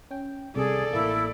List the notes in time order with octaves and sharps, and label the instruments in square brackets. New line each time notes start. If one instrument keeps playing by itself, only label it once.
[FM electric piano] C#4 G5
[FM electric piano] C2 C3 [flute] G#4 [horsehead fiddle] A4 D5
[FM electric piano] A1 A#3 [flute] E4